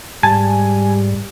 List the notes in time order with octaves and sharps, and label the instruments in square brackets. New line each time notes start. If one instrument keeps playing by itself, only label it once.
[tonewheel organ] G#2 [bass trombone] G3 [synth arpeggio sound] G#5 [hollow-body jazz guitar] A5